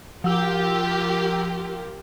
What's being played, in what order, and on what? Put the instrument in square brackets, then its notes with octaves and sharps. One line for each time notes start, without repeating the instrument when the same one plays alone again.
[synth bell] F3 E6 [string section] F4 G4 A#4